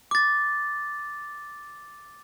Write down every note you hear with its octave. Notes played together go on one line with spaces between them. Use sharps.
D6 A6